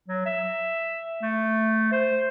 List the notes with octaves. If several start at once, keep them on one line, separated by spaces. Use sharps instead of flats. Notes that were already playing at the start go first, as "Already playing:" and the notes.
F#3
E5
A3
C5